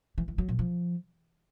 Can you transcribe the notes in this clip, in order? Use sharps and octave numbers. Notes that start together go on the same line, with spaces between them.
E3
E3
F#3
A#2
F3